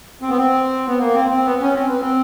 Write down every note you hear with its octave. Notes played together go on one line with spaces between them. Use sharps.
C4
B3
C4
B3
A#3
C4
C4
B3
C#4
C4
B3
C4